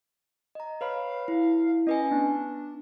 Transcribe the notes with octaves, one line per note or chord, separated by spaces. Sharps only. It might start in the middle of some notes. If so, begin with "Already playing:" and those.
D#5 A#5
B4 C#5 F5 B5
E4
C#4 B4 D#5 G#5
B3 D4